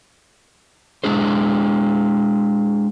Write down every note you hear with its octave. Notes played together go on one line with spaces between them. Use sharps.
G#3 D4 G#4 C5